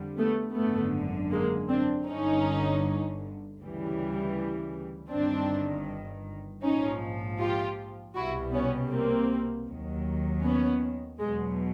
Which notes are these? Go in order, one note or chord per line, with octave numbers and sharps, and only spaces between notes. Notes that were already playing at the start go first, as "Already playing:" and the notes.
Already playing: F2 D3 G3
A3 B3
G#1 F#2 D3 A3 B3
G#3 A#3
C4 D4
G1 G2 D3 C#4 D#4
D2 C#3 E3 G3
G1 G2 D#3 C4 D4
A#1 G#2 F3 C#4 D#4
F4 G4
C2 B2 G3 E4 F#4
B3 C#4
A#3 C4
D#2 D#3 F#3
B3 C#4
E2 B2 F#3 G#3